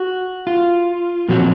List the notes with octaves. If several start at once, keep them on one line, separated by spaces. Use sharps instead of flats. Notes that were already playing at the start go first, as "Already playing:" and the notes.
Already playing: F#4
F4
A#2 F3 F#3 C4 F#4